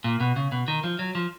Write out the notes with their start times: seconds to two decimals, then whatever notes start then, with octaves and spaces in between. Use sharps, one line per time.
0.04 A#2
0.20 B2
0.36 C#3
0.52 B2
0.68 D#3
0.84 F3
0.99 F#3
1.15 F3